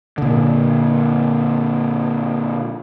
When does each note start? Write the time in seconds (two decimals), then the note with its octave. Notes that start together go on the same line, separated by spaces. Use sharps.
0.18 A#2 D3